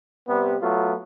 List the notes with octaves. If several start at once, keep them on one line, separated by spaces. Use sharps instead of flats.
C3 G3 B3
F#3 A3 B3 F4